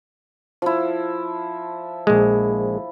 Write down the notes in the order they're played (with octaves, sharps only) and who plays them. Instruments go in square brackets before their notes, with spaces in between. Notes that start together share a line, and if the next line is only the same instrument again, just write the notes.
[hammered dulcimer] F3 E4
[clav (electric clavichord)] A#1 G#3